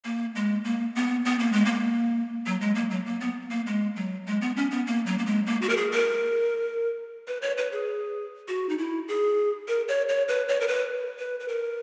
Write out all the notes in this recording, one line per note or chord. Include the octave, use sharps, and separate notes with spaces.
A#3
G#3
A#3
B3
B3
A#3
G#3
A#3
F#3
G#3
A#3
F#3
A#3
B3
A#3
G#3
F#3
G#3
B3
C#4
B3
A#3
F#3
A#3
G#3
A#3
F#4
A#4
G#4
A#4
B4
C#5
B4
G#4
F#4
D#4
E4
G#4
A#4
C#5
C#5
B4
C#5
A#4
B4
B4
B4
A#4